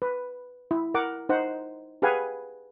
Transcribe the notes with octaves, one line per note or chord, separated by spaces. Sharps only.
B4
E4
A#4 F#5 D6
D#4 C5 F#5
G4 G#4 B4 F5 F#5 G#5